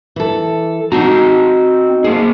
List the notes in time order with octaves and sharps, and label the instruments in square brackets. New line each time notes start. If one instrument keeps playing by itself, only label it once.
[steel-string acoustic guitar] E3 A4
[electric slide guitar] C4 A5 A#5 [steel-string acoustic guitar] D#4 F#4
[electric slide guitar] A#3 G#4 [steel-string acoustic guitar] C5